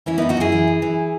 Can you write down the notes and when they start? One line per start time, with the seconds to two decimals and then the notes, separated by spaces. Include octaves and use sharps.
0.06 E3 C#4 E4
0.18 B3 D#4
0.22 F#2
0.29 D#4 F#4
0.37 F#2 E4 G#4
0.52 E3
0.67 F#2
0.82 E3